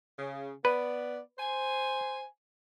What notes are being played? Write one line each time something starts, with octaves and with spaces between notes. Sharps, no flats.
C#3
B3 B4 D5
C5 G#5